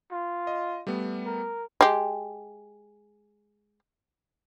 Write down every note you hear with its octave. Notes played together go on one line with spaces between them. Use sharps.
F4
D#5
G3 A3 B3
A#4
G#3 G4